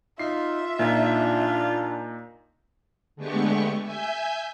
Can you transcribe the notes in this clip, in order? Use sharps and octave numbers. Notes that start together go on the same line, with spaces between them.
D#4 F4 E5 C7
A#2 D4 D#4 F4
D3 G#3 A3 B3 G4 C#6
E5 G#5 G6